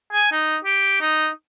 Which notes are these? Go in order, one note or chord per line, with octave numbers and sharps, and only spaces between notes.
G#5
D#4
G4
D#4